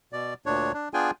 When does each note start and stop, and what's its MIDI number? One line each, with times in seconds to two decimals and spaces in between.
0.13 0.34 47
0.13 0.34 74
0.46 0.72 38
0.46 0.72 46
0.46 0.72 62
0.46 0.72 73
0.74 0.89 62
0.94 1.11 59
0.94 1.11 62
0.94 1.11 65
0.94 1.11 68
0.94 1.11 79
0.94 1.11 80